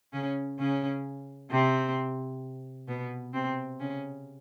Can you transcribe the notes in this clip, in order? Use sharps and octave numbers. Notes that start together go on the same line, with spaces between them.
C#3 C#4
C#3 C#4
C3 C4
B2 B3
C3 C4
C#3 C#4